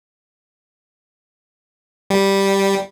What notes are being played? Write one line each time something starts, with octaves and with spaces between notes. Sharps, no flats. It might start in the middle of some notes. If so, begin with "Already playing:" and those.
G3